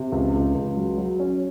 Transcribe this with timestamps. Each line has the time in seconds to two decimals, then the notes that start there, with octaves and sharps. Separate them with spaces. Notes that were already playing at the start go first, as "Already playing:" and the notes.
Already playing: C3
0.12 C#2
0.34 C#2
0.55 C#2
0.76 F#3
0.98 F#3
1.20 C#4